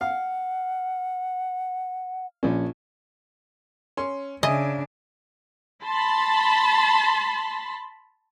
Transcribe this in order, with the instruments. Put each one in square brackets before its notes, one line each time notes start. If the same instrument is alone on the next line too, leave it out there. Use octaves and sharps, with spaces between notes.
[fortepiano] F5 [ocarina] F#5
[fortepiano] A#1 C#4
[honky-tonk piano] C#4 C6
[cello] C#3 D4 [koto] D#5 [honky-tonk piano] E5 G#5
[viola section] A5 B5 C6